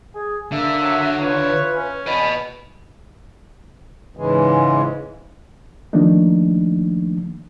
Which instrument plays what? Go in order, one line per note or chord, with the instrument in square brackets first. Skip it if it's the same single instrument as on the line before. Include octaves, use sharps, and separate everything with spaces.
[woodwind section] G#4
[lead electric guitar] D3 [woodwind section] A#3 E5
[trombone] F#3
[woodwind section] E4 F4 B4 [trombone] C#5
[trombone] C#4
[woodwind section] E2 B5 [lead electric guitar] B4 D#5
[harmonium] G#2 C#3 E3 G#3
[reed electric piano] D#3 F3 A3 A#3 D4 D#4